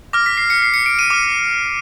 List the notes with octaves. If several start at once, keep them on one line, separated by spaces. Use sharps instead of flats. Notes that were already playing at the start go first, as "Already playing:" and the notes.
D6 F6 A#6
B6
C7
C#7
C7
C#7
D7
D#7
D6 F6